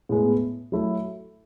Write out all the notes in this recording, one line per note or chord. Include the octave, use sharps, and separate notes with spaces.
A2 G#3 B3
F#3 A3 E4